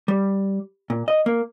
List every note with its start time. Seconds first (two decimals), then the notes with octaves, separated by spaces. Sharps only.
0.08 G3
0.90 A#2
1.08 D#5
1.26 A#3